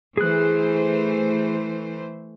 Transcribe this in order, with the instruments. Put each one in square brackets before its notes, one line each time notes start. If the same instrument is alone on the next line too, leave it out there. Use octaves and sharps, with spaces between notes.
[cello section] E3 A3 C5 [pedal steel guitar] G#4 F#6